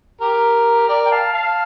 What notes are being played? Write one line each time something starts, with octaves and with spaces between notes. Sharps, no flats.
G4 A#4
A#4 D5
G5
F5 A5
F5 A5